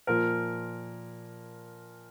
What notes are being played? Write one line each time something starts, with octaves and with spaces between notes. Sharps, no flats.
A#2 F3 A#4